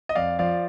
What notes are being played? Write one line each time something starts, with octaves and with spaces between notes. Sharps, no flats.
D#5
F2 D5 F5
F3 D5 F5